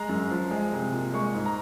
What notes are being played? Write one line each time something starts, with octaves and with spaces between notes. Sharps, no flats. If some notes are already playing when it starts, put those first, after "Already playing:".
Already playing: G#3 A#5
F#2
F3
G#3
C2
A#2
G#3 C#6
G#2
A#5